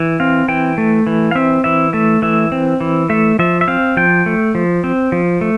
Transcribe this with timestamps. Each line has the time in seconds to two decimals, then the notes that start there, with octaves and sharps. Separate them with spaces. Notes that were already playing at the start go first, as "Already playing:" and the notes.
Already playing: E3
0.20 C4 F5
0.48 E3 G5
0.78 A3
1.07 E3
1.31 F5
1.35 C4 E5
1.64 E3 E5
1.93 A3 E5
2.22 E3 E5
2.52 C4
2.80 E3
3.09 A3 E5
3.39 F3 E5
3.61 E5
3.68 C4 F5
3.97 F3 G5
4.26 A3
4.55 F3
4.84 C4
5.12 F3
5.41 A3